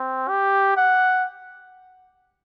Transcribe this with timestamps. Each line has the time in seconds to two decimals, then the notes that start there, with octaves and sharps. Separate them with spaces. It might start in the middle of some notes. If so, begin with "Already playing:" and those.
Already playing: C4
0.28 G4
0.77 F#5